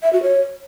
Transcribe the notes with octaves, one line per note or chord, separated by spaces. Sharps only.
E5
F#4
C#5